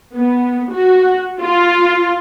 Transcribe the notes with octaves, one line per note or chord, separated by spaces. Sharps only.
B3
F#4
F4